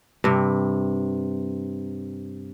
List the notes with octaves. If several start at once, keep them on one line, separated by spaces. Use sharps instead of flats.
G2 C3